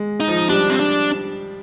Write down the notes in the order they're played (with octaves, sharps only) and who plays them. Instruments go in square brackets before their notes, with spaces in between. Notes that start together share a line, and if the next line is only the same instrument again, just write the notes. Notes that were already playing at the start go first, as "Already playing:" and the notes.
Already playing: [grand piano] G#3
[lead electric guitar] D#4
[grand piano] F3
[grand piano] G3 [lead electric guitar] D4
[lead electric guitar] C4
D4